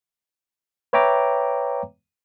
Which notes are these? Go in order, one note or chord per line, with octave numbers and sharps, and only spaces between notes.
B4 C#5 E5 G5 A#5 D6